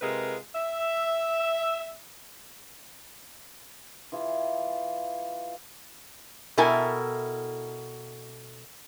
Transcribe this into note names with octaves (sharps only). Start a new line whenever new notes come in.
C3 G#3 F4 G#4 A#4 B4
E5
E3 F4 G#4
B2 E4 A4 A#4 G5 G#5